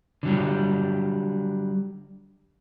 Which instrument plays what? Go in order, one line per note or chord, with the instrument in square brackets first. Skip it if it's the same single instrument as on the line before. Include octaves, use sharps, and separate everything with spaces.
[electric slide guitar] D3 F#3 G3